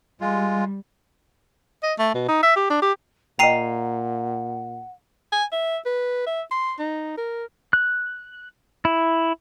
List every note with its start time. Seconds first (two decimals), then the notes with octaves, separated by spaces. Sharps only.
0.21 G3 G#3 F4
1.83 D#5
1.99 A3
2.15 B2
2.29 D#4
2.43 E5
2.56 G4
2.70 D4
2.82 G4
3.39 A#2 D#5 F#5 G5 A#5 C7 D#7
5.32 G#5
5.52 E5
5.86 B4
6.27 E5
6.51 C6
6.79 D#4
7.17 A#4
7.73 F#6
8.85 E4